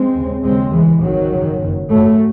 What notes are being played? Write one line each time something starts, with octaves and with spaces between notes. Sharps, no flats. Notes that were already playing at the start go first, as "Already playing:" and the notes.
Already playing: G#3 C4
D#2 C#3
D#2 C#3 G#3 C4
C#2 C#3 E3 G#3
G#1 G#2 D#3 F#3
F#1 F#2 C#3
F#1 F#2 C#3
G#1 F#2 C#3 F#3 A3